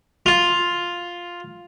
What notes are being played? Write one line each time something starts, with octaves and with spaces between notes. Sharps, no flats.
F4